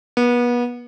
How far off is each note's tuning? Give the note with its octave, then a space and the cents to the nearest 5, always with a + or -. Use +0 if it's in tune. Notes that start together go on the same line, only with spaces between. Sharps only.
B3 -30